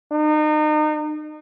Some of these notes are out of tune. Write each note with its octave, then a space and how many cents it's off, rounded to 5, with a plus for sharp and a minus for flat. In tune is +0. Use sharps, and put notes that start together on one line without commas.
D#4 -35